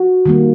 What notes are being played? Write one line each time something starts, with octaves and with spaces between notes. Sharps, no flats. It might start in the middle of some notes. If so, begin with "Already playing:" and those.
Already playing: F#4
D#3 G3 A#3